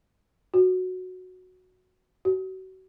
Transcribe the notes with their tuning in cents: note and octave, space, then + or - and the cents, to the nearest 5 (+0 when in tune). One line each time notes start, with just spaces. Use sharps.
F#4 -5
F#4 +30